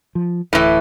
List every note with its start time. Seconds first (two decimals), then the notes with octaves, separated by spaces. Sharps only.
0.15 F3
0.53 D1 A2 E3